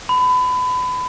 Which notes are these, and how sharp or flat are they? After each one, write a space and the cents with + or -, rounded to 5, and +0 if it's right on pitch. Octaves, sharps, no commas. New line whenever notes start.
B5 +30